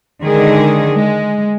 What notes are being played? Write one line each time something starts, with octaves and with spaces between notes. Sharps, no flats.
D3 D#3 G#3 G#4
G#3